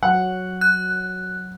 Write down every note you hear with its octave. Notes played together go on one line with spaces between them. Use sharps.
F#3 F#5
F#6